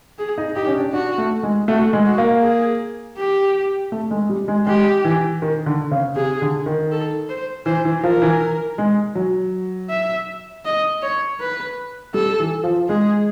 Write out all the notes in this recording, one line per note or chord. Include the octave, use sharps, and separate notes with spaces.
G#4
D#4
D#4 G4
C#4
D4
D4 F#4
A3
G#3
A3 F#4
G#3
F#4
A#3
G#4
G4
A3
G#3
G3
G#3
G#3 G4
E3
D#3
D3
C#3
C3 G#4
D3
D#3
A4
C5
E3 C5
E3
F3 A#4
E3
G#3
F#3
E5
D#5
C#5
B4
G3 A4
E3
F3
G#3 G#4